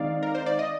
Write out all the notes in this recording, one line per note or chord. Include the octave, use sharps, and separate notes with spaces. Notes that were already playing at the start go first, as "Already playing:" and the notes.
Already playing: D#3 G#3 C4 D#4 D5 F5
A#4
C5
D5
D#5